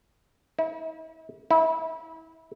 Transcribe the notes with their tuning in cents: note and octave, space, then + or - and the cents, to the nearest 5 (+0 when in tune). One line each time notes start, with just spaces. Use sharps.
E4 -45
E4 -30